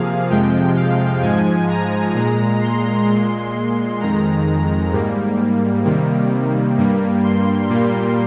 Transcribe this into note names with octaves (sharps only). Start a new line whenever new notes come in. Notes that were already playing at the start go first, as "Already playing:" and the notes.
Already playing: C3 F3 A#3 G#4 F5
F2 C3 F3 G#3 G5
F5
G#2 F3 G#3 G#5
A#5
A#2 G#3
C6
A#2 G#3
C6
F2 D#3 G#3 A#5
G#2 G3 A#3
C3 D#3 G3 A#3
G2 G3 A#3
C6
A#2 G3 A#3